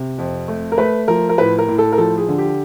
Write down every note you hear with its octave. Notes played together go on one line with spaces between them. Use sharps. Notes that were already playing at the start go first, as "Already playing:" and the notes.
Already playing: C3
F2
A3
A#4
A3 B4
F3 A#4
A#4
A2 B4
A#4
A2
A4
A#4
F3 A4
G#4
D3
G4